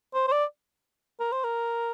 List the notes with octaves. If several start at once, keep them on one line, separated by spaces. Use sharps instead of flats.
C5
C5
D5
A#4
C5
A#4